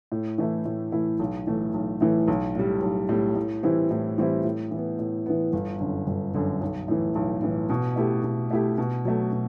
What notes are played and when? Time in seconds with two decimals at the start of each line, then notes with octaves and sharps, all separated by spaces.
0.12 A2
0.38 E3 A3 E4
0.65 A2
0.92 E3 A3 E4
1.19 B1
1.47 A2 E3 A3
1.74 B1
2.01 A2 E3 A3
2.28 B1
2.55 A2 G3
2.82 B1
3.09 A2 G3
3.36 A2
3.63 E3 G3 C4 E4
3.91 A2
4.18 E3 G3 C4 E4
4.45 A2
4.71 E3
4.76 B3
4.99 A2
5.26 E3 B3
5.53 G1
5.80 F#2 D3
6.07 G1
6.34 F#2 D3
6.61 B1
6.88 A2 E3
7.15 B1
7.42 A2 E3
7.70 B2
7.96 A3 E4 G4
8.24 B2
8.51 A3 E4 G4
8.78 B2
9.05 F#3 A3
9.32 B2